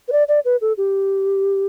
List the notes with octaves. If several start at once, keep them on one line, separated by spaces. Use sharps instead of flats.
B4
D5
D5
B4
A4
G4